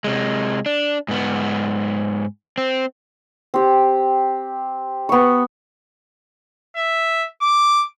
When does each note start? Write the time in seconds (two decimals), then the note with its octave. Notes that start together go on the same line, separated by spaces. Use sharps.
0.04 C3 G#3
0.66 D4
1.08 G#2 B3
2.58 C4
3.54 C4 G4
5.09 B3 C#6
6.76 E5
7.42 D6